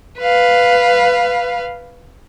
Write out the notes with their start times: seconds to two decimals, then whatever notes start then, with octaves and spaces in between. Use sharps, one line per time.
0.19 B4 F5